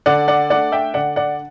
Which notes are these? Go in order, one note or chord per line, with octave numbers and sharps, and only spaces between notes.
D3 D5 F#5
D5 F#5
A3 D4 D5 F#5
E5 G5
D3 D5 F#5
D5 F#5